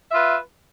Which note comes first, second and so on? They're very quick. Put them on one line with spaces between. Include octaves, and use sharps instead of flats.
E5 F4 B4